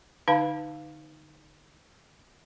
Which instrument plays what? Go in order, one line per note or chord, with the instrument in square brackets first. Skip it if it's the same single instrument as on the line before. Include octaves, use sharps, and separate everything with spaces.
[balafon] D3 D#4 B4 F5 A5